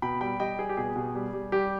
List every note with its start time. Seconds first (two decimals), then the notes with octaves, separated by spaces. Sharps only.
0.02 B2 G5 B5
0.21 G3 G5 B5
0.40 G3 D#5 G5
0.59 G3 G#4
0.69 G4
0.77 B2 G#4
0.96 B2
1.15 G3
1.33 G3
1.52 G3 G4